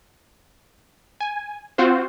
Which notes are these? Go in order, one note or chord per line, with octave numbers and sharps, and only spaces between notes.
G#5
C4 F4 F#4 C5